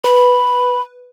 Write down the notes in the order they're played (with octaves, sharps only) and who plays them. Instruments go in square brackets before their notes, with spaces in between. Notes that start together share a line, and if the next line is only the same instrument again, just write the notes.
[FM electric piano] B4 [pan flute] B5